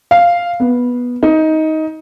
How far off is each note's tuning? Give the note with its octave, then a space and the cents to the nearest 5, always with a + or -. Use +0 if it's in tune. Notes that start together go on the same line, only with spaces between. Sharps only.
F5 -5
B3 -10
D#4 +15